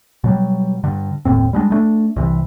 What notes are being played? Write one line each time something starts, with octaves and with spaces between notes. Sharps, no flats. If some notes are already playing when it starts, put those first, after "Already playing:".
B2 F#3 G3
G2 D3
F#1 D#2 A2 C4
G3 G#3 B3 D4
G#3 A3 D4
C2 C3 E3